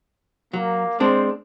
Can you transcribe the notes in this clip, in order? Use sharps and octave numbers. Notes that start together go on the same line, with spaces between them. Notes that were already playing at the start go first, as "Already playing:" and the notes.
F#3 A#3
G#3 C4 D4 C5